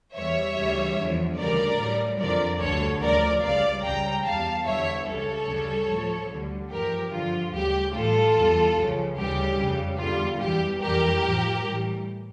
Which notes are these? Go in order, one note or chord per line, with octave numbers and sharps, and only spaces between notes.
E2 E3 G3 C#5 E5
D2 C#3 E3 G3
E2 D3 F3
D2 C#3 G3 A#4 D5
A2 G3
F2 D3 F3 A#4 D5
D2 D3 G3 A4 C#5
D2 C#3 F3 A#4 D5
C#2 C#3 G3 D5 F5
C#2 C#3 G3 G5 A#5
E2 E3 G3 F5 A5
E2 D3 G3 C#5 E5
C#2 C#3 G3 A4 C#5
D2 C#3 G3
A2 F3
D2 D3 G3
G2 F3 G4 A#4
G2 D3 F3 F4
D2 C#3 G3 G4
A2 E3 G3 F4 A4
E2 E3 G3
C#2 C#3 F3
D2 C#3 E3 G3 G4
F2 C#3 G3
E2 D3 G3 F4
E2 E3 G3 G4
F2 E3 G3 G4 A#4
A2 F3
A2 E3 G3